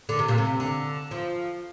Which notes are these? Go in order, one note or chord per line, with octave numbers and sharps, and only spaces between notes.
D3
C3
A#2
C3
D3
F3